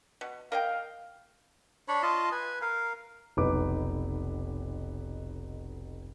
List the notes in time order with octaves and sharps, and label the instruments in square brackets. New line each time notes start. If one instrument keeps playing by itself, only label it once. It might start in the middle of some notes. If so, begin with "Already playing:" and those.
[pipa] B2
[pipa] A#4 D#5 G5 [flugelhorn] F5
[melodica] D4 C#5 B5
F4 D#5 F5 A5
B4 G#5
A#4 F5
[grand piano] F1 B1 D#4 B4 D6